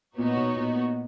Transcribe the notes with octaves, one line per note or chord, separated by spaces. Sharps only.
A#2 B3 D#4 F#4 C#5
B2
A#2